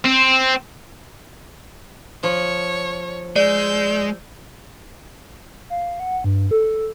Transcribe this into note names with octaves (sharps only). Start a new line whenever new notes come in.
C4
F3 C#5
G#3 D5 E6 G6
F5
F#5
G2
A4